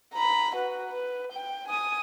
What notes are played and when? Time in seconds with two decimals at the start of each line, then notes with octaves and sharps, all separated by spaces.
0.13 A#5 B5
0.55 F#4 B4
0.89 B4
1.32 G5
1.68 G#5 D#6